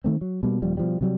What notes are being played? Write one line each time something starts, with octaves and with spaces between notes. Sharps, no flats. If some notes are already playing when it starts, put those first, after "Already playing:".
D#3 A3 C4
F#3
B2 G3 A#3
D#1 F3 G3
B2 F3 G3
C3 F#3 G3